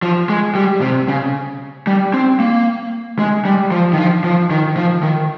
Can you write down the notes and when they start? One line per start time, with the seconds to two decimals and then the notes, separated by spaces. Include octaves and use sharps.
0.02 F3
0.29 G#3
0.55 G3
0.82 C3
1.08 C#3
1.87 G3
2.14 C4
2.40 A#3
3.19 G#3
3.45 G3
3.71 F3
3.93 D#3
3.98 F3
4.24 F3
4.51 D#3
4.77 F3
5.03 D#3